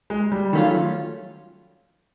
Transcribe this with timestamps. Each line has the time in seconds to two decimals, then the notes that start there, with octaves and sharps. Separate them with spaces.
0.10 G#3
0.32 G3
0.53 D#3 F#3 A3 C#4 F4